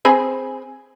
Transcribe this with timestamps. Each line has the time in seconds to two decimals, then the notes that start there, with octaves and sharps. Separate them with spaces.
0.05 C4 G#4 B5